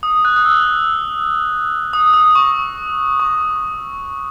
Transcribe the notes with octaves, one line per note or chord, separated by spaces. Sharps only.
D#6
F#6
D#6
E6
D#6
D#6
C#6
C#6